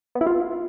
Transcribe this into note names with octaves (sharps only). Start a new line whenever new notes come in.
B3
E4
F4